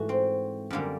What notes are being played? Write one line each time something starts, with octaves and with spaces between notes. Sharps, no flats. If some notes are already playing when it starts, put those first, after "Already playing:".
Already playing: G#2 E3 A3 F#4
C4
F#2 D3 G3 A#3